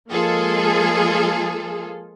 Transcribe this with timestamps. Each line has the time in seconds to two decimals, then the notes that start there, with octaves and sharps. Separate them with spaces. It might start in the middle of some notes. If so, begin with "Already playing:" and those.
0.11 F3 G#3 A#3 F4 G#4 A4